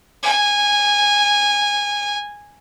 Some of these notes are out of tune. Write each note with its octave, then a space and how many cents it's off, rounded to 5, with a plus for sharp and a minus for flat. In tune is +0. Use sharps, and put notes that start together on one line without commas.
G#5 -15